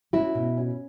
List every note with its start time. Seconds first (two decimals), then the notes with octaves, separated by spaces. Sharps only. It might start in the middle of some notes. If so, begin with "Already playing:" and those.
0.13 C#4 E4 F#4
0.35 B2
0.57 C#4